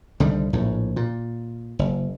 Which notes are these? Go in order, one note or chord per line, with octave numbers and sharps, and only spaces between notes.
C2 D3 D#3 G3
A#1 A2
A#2
F#1